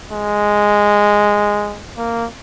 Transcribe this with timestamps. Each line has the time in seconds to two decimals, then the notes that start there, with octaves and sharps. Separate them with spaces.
0.11 G#3
1.98 A#3